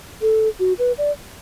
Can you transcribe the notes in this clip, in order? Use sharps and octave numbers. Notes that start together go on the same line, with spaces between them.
A4
F#4
B4
D5